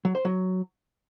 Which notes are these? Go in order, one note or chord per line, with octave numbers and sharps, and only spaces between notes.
F#3
C5
F#3